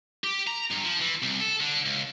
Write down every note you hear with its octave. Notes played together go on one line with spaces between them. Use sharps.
G4
A#5
G2
F3
E3
C2
A4
D3
C#2